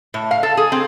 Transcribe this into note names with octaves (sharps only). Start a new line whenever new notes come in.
A2
F5
A4
G#4
C4